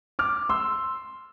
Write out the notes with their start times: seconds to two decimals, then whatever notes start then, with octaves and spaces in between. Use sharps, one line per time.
0.19 D6 F6
0.49 C6 E6